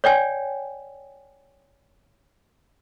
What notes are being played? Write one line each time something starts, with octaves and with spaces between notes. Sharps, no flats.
C#5 D5 G5 G#5